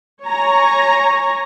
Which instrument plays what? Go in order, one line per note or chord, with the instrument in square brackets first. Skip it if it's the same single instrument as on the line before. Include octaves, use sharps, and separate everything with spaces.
[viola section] C#5 G#5 A#5